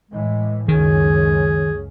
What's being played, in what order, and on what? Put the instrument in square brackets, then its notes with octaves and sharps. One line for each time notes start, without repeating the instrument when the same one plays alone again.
[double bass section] A2 E3 [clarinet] G#3
[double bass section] C#2 F#2 C#4 [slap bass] D#3 [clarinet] G#4